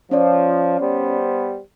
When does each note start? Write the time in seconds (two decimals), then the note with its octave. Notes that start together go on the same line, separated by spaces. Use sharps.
0.11 F3 C#4 C#5 D5
0.80 G3 B3 C5